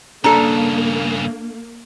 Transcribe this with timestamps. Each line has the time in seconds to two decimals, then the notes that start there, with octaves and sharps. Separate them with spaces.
0.24 G2 C#3 A#3 D4 A4 A#5